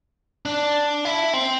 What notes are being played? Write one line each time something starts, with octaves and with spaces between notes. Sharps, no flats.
D4
E4
C4